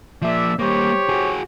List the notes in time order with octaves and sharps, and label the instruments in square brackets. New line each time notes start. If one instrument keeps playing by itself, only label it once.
[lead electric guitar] F3 A#3 [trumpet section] D5 E5
[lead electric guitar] G3 A#3 [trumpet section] G4 C5 C#5
[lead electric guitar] F#4 G#4